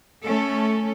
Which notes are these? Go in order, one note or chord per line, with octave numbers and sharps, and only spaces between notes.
A3 C#4 A4